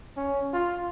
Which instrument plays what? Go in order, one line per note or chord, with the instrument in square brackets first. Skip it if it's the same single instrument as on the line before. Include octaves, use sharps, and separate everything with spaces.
[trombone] C#4
F4